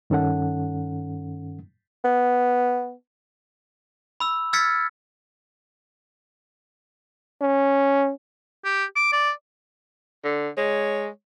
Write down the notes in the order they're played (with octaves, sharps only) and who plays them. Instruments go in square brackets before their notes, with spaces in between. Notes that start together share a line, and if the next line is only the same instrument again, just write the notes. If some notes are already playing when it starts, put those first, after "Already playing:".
[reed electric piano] G2 D#3 C#4 A4 F#5
[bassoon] B3
[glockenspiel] B5 E6
E6 F6 G#6 A6 B6 C#7
[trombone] C#4
[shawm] G4
D6
D5
[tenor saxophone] D3
[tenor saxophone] G#3 [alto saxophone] C#5